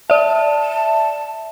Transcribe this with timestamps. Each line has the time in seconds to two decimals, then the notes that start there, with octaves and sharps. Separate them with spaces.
0.10 D5 E5 A5